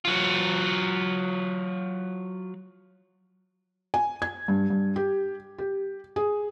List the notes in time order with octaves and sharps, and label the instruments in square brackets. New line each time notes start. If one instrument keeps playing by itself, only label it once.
[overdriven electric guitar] F#3 F4
[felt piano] G#5
G#6
G2
G2
G4
G4
G#4